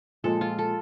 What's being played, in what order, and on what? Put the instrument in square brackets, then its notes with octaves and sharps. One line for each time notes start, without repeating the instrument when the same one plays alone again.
[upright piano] A#2 F3 G#3 [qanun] A4
[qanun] F4
A4